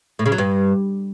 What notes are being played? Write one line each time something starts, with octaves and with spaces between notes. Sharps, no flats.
A2
C#3
F#3
G2